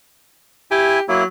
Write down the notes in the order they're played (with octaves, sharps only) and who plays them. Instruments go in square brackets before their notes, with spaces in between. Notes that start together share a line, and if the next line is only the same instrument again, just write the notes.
[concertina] E4 G#5 [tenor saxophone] G4
[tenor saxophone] F#3 [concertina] A#3 E4